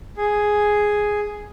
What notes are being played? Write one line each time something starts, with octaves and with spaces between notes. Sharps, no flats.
G#4